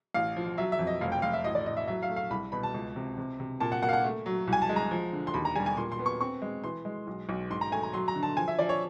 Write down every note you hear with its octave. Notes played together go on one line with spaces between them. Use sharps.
A1 F5
F3
F#3 E5
E5
F2
D#5
F1 F5
G5
F1 F5
E5
A1 D#5
D5
A2 D#5
E5
F#3 E5
F5
A3
F5
C2 B5
B2 B5
A5
C#2
C3
C3
C3
A#2 A5
F#5
A#3 F#5
F5
F#5
A3
F#3
C2
G#5
A5
G#3
A#5
F3
D3
C6
D#2 B5
A#5
G3 G#5
G#5
A#2 C6
C6
B3
C#6
C4 C#6
G#3
E3 C6
G#3
B1
B1
G#2 C6
A#5
A3 G#5
A#5
F#3 C6
A#5
D3
A5
F3 G#5
E5
F3 D5
C#5